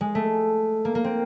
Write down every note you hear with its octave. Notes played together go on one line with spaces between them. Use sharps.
G#3
A3
A#3
A#3
C4